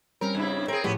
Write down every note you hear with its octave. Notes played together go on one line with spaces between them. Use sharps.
G3 C4 C#4 A#4
G2 C#3 E4
C4 G#4 A#4 E5
A2 F3 B3 C#4 G4